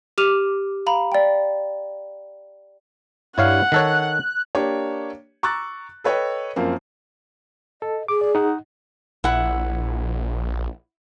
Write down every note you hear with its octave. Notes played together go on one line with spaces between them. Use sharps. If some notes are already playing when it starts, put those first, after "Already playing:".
G4 D6 F6 D#7 F7
F5 A#5 B5
D5 G5
G2 E4 C#5 F5 F#5
D#3 A4 C#5 F#6
A#3 D4 G4 C#5
A#5 C#6 D6 E6 F#6 A6
A4 B4 C#5 D#5 G5
F#2 F3 A#3 C4
A4 D#5
G#4 D6
D5
D#4 D#5 F#5
A#1 E4 F#5